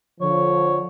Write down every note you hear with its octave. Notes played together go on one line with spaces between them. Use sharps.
D3 F3 C#5